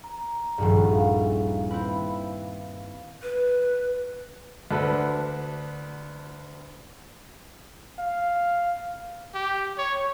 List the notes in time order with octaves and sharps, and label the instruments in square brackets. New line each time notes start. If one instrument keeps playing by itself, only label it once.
[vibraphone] A#5
[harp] D#1 A#1 G2
[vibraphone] F5
[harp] C4 E4 B4
[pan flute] B4
[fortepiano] D2 D3 D4 F#4 A4 B4
[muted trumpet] F5
[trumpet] G4
C#5